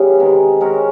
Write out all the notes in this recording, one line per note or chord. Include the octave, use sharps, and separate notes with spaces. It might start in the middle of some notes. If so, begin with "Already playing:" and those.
Already playing: C#3 E3 G3 B3
C3 D#3 G#3
G#3 C#4 F#4 A#4